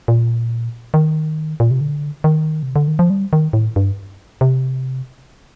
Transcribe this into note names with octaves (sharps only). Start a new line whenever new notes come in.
A#2
D#3
A#2
C3
D3
D#3
C3
D3
D#3
F3
G3
D#3
A2
G2
C3